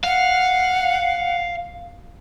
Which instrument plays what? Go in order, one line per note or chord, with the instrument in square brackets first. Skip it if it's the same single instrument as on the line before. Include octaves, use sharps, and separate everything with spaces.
[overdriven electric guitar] F5 [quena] F#5